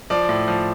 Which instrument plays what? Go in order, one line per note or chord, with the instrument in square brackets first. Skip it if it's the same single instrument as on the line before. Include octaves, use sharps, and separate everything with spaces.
[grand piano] F3 D5
A2
F3